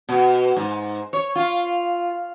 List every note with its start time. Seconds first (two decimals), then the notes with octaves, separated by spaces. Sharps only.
0.09 B2
0.57 G#2
1.13 C#5
1.35 F4